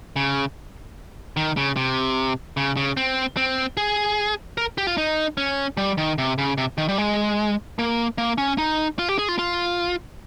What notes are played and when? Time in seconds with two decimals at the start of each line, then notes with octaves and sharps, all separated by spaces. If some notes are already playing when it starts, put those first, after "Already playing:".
0.16 C#3
1.37 D#3
1.57 C#3
1.76 C3
2.57 C#3
2.77 C#3
2.97 C4
3.37 C4
3.77 G#4
4.58 A#4
4.78 G4
4.87 F4
4.98 D#4
5.38 C#4
5.77 G3
5.98 D#3
6.18 C3
6.38 C#3
6.58 C3
6.78 D#3
6.88 G3
6.98 G#3
7.79 A#3
8.18 A#3
8.38 C#4
8.58 D#4
8.99 F4
9.09 G4
9.19 G#4
9.29 F4
9.39 F4